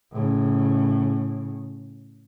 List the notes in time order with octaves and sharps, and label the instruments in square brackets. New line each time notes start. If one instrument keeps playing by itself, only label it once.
[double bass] A2 C#3